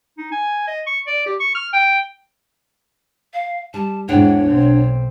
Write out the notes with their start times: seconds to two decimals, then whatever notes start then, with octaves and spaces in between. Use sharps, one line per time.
0.18 D#4
0.32 G#5
0.68 D#5
0.87 C#6
1.07 D5
1.26 G4
1.40 C#6
1.55 F6
1.73 G5
3.34 F5
3.74 G3 A5
4.09 E2 G#2 D4 C#5 F#5 G5
4.50 B1 C4